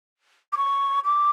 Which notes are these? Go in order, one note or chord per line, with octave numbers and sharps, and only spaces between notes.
D6
C#6
D6